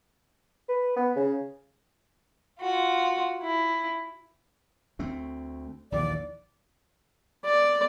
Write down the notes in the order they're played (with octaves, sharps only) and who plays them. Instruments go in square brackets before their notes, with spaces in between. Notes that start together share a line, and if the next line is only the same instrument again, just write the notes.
[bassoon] B4
B3
C#3
[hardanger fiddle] F4 F#4
E4
[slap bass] D2 A3 C4
[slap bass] A#1 D#2 E3 [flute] D5
[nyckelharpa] D5